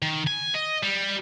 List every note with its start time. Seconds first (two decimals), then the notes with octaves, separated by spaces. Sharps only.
0.02 D#3
0.27 G#5
0.55 D#5
0.83 G3